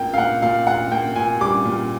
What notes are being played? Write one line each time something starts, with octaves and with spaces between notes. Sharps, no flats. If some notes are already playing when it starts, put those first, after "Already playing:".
Already playing: A#2 A#3 G5
F5
A#2 F#5
A#2 F5
A#2 F#5
A#3 G5
A#2 G#5
G3 D6
A#2